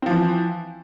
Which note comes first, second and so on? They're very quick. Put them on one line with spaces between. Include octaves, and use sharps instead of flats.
C4 F3 E3